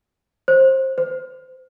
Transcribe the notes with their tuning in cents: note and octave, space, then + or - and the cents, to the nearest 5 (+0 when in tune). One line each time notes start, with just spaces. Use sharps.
C5 +20
C5 -30